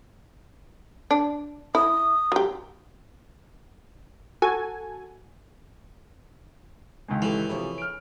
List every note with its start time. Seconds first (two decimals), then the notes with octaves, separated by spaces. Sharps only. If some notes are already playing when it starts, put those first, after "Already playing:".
1.11 D4
1.75 E4 D#6
2.32 F#3 G4
4.42 F#4 A4 G#5
7.08 C#2 D#3 G#3
7.22 E3 C#4 G4 A4
7.49 C3 F3 E4 G#4 C#5
7.78 F6 D7